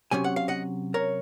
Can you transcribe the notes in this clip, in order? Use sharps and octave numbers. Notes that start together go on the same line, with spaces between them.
C3 F#3 C#4 G#5
F#5
F5
D#5 F#5
A#4 C#5